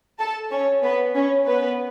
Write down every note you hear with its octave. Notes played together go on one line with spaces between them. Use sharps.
A4 A5
C#4 C#5
B3 B4
C#4 C#5
B3 B4